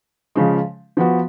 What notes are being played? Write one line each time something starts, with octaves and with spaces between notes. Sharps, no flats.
C#3 F3 G#3
F3 B3 F#4